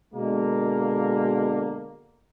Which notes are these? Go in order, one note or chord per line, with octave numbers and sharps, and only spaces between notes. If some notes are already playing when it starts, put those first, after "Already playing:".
B2 D3 G#3 A#3